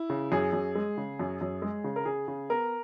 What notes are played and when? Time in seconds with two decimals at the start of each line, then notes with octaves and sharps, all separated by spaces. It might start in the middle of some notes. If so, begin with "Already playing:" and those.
Already playing: E4
0.10 C#3
0.32 F#2 G#4
0.53 F#2
0.75 G#3
0.97 C#3
1.19 F#2
1.41 F#2
1.62 G#3
1.84 C#3
1.96 A#4
2.05 C#3 G#4
2.28 C#3
2.49 B3 A#4